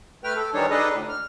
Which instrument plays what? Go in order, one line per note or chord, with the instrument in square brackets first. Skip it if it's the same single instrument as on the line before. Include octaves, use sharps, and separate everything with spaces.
[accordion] A3 B4 G5 F6
A4
D#3 E3 G3 D4 D#4 C#5
D4 D#4 G#4 A4 B4 D#5
D2 A2
F6